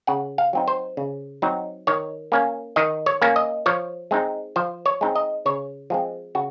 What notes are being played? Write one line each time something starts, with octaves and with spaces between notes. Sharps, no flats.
C#3 F#5
F5
F#3 C4 D#4
C5
C#3
F#3 C4 D#4
D#3 C#5
A#3 C#4
D#3 D#5
C#5
A#3 C#4
D#5
F3 C#5
G#3 C4 D#4
F3 C5
C#5
G#3 C4 D#4
D#5
C#3 C#5
F3 G#3 C4
C#3 F#4